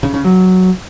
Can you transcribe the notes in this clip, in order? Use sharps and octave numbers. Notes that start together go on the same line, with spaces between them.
C#3
C#3
F#3